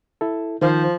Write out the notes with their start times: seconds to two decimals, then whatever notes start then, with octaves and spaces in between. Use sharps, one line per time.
0.21 E4 A4
0.62 D#3 F3 D#4 C5 F5